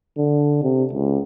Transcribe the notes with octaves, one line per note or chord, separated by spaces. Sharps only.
D3
C3
C#2